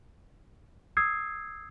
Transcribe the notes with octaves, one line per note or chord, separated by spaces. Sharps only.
D#6 E6 G#6 C7